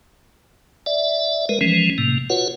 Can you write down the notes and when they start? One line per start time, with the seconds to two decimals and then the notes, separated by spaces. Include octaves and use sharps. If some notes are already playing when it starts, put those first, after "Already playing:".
0.86 D5 E5
1.49 G#3 A#4 B4
1.61 E3 F3 G#3 C#4
1.98 A2 C3 A#3
2.30 F4 F#4 B4 C#5 F#5